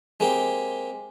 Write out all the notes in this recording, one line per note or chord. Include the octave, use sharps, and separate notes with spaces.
G#3 A#3 C4 G4